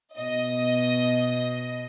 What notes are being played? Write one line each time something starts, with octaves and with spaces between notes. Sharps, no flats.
B2 D#5